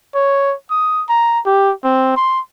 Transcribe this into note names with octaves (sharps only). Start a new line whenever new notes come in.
C#5
D#6
A#5
G4
C4
C6